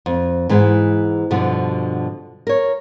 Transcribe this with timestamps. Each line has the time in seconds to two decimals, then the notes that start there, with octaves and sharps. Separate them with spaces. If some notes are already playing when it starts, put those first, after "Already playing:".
0.06 F2
0.49 G#2 E3 G#3 B3
1.31 G2 B2 D3 F3
2.47 A#4 C#5